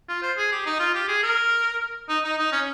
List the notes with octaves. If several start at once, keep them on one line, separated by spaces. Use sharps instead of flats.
F4
C5
G#4
G4
D#4
F4
G4
G#4
A#4
D#4
D#4
D#4
C#4